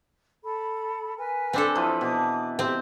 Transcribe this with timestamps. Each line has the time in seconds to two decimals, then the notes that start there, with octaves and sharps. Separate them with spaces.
0.44 A4 B5
1.17 A#4 B4 G#5
1.53 C4 D4 A4
1.75 E3 F3 B4
2.01 B2 D6 D#6
2.59 C4 G4